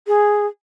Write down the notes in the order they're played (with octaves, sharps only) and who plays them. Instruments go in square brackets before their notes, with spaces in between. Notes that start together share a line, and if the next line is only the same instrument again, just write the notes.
[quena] G#4